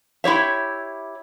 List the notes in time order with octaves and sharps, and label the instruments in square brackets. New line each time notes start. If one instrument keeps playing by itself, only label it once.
[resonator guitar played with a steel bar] E4 G4 C#5 E5